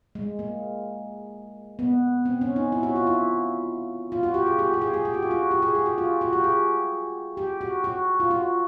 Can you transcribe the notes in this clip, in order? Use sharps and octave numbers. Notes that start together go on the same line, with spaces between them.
G#3
A#3
B3
C4
C#4
D#4
E4
F#4
F4
E4
F4
F#4
G4
G#4
G4
G4
G#4
G4
G4
F#4
F4
F#4
G4
G#4
G4
F#4
F4
F#4
G4
G#4
G4
F#4
F#4
F4
F#4